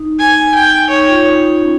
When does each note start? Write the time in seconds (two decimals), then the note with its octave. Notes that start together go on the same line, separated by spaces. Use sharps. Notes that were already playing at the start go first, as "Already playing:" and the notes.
Already playing: D#4
0.19 G#5
0.55 G5
0.90 D#4 C#5
1.07 F4
1.25 D#4
1.43 D#4
1.60 C#4